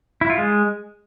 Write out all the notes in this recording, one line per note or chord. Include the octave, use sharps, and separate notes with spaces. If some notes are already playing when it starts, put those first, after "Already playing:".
E4
F4
G#3